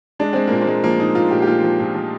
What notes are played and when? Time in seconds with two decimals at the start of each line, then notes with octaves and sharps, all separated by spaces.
0.19 G#3 D4
0.33 G#3 C4
0.47 A#2 A#3
0.61 C4
0.67 G#3
0.84 F3 A#3
1.00 A#2 D#4
1.15 A#2 F4
1.31 A#2 G4
1.42 G4
1.47 A#2 F4
1.63 F3
1.80 A#2
1.95 F3